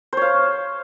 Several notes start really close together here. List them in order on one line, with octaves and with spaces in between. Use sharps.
C5 C#5 F5